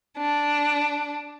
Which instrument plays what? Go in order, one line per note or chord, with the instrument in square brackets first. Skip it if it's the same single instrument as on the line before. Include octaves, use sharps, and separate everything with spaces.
[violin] D4